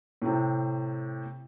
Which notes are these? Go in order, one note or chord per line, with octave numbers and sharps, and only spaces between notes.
A2 C3